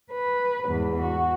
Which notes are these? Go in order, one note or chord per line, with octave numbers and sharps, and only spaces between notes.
B4
E2 G#2
F#4